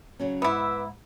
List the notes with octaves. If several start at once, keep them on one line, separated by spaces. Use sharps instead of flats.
C#3 F#3 C#4
G#2 B3 E4 B4 E5 D6